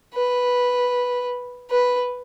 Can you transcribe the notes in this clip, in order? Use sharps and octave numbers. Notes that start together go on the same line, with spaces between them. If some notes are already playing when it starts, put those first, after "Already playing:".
B4
B4